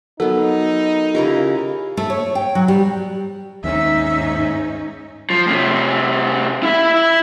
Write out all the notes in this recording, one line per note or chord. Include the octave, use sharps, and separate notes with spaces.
F#3 B3 D#4 A4 A#4
C#3 E4 F4 G4 A#4
A3
C#5
G5
F#3
G3
D#2 G#2 D#3 C4 C#4 D#4 E5
F3
A2 C3
E4 E5